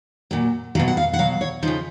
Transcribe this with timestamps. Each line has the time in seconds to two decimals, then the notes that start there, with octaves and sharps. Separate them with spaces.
0.31 A#2 F#3
0.75 F#3 F5
0.79 B2
0.88 F#5
0.97 F5
1.13 F#5
1.19 B2 F#3 F5
1.41 C#5
1.63 C#3 F3 D#4